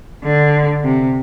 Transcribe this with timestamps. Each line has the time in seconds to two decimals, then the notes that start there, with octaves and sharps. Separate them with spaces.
0.24 D3
0.84 C3